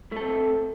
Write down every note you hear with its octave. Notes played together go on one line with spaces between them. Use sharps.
A3 C4 A4